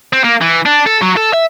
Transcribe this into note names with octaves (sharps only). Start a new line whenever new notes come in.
C4
A#3
E3
D4
A4
F#3
A4
E5